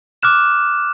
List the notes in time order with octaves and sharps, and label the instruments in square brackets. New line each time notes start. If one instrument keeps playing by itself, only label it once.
[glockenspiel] D6 F6 F#6 E7